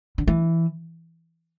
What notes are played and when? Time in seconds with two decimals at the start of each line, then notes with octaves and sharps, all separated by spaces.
0.18 D3
0.27 E3